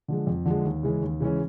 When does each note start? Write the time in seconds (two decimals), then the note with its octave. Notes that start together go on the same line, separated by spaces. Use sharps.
0.08 D3 F3 G#3
0.27 F2
0.45 D3 F3 G#3
0.65 D#2
0.83 C#3 E3 G#3 C#4
1.02 D#2
1.20 C#3 E3 G#3 C#4